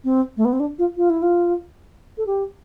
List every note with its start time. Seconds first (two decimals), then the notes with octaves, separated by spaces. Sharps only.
0.04 C4
0.37 A3
0.45 B3
0.53 C4
0.60 D4
0.79 F4
0.97 F4
1.10 E4
1.22 F4
2.18 A4
2.27 G4